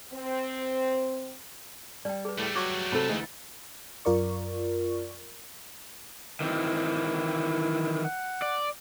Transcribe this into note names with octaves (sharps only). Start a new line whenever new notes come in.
C4
G3 D5 G5
G#4 B4
A2 A3 G4
F#3 C#6 D6
C3 A4 B5
D2 E3 G#3 D#4
F#2 F4 A#4 D5 C#6
D#3 E3 C4 E4
F#5
D5